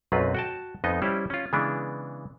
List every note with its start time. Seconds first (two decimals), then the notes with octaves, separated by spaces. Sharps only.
0.12 B1 F#2 F#3 C4 F4 B4
0.35 F#4 G5 A5
0.84 F2 B3 D#4 D#5
1.02 G3 C#4 E4 G4 C5 D5
1.30 C#4 F4
1.53 C#3 E3 G#3 B3 D4